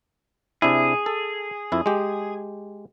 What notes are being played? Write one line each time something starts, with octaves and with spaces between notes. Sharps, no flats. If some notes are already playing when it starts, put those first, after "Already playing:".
C3 D4 E4 G#4
A4
F2 E4
G#3 G4